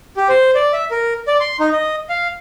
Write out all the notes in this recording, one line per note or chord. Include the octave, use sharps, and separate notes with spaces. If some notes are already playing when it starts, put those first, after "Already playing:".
G4
C5
D5
E5
A#4
D5
C6
D#4
D#5
F5